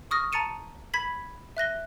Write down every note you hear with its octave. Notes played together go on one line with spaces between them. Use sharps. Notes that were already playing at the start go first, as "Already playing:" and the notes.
C#6 D#6 F6 A#6
A5 A#5 A6 C#7 D#7 E7
B5 G#6 B6 F#7
E5 F#6 A#6 G7